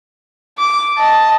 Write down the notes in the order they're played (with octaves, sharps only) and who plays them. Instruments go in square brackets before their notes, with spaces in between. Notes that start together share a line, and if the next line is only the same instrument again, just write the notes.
[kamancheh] D6
D#5 A5